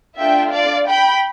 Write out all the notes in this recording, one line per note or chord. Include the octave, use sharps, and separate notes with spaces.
A3 D4 F4 E5 G5
D5 F5
G5 B5